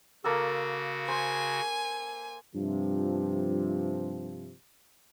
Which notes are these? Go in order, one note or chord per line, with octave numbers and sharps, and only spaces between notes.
C#3 A#3 F#4 A4
C5 G#5
G2 C3 F3